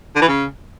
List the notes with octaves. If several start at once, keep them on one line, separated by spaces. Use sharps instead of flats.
D3
E3
C#3